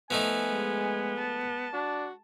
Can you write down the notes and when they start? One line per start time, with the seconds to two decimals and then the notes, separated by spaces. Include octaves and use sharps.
0.11 F3 A3 B3 D#4 G#5
0.49 G#3
1.19 A5
1.73 D4 F#4